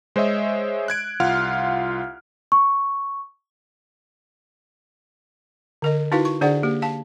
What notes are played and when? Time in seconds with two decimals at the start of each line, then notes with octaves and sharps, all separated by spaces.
0.16 G#3 C5 C#5 D#5 E5
0.88 F#6 G#6 D7
1.20 C2 F4 F5 F#5 F6
2.52 C#6
5.82 D3 A#4 D#5
6.12 D#4 E4 F#4 B4 F5
6.25 C#6
6.41 D3 D4 G#4 C5 D5 F#5
6.63 A#3 G4
6.82 F5 A5